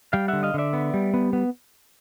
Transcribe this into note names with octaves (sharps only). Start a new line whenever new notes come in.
G3 F5 G5
D3 E5 F#5
D#5 F5
D3 D5 E5
B3
G3
B3
B3